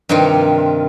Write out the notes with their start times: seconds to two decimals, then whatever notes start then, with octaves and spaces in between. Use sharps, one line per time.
0.09 G2 C3 D#3 F3 F4